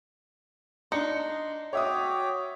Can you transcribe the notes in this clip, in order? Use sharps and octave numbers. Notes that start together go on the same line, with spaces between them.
D4 D#4 A#5 C6 C#7
F#4 C#5 E5 G5 D6 D#6